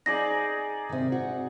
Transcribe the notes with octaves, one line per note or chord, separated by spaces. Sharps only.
D#4 G#4 D5 A#6
C3 D#3
F#4